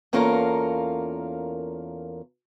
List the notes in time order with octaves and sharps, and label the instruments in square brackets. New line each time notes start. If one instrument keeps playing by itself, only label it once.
[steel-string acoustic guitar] E2 A#3 C#4 F4 A4 A#4